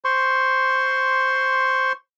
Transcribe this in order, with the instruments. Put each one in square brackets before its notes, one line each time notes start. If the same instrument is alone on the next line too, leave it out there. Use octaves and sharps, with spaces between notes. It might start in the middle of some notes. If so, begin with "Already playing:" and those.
[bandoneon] C5 C6 C#6